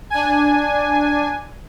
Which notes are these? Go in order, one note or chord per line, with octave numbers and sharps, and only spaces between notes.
D4 G#5